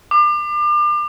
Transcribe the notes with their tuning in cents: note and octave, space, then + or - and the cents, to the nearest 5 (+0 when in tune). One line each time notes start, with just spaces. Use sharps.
D6 +35